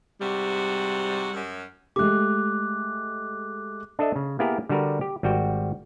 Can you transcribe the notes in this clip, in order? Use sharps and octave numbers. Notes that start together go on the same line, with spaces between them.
G#2 C3 G3 F#4
F#2
G#3 A3 G4 D6 F#6
D4 A4 D#5 E5
C#3
A#3 B3 E4 G4 G#4 A#4
D3 G3 F#4 A#4 B4
G4
G#1 G3 F#4 G5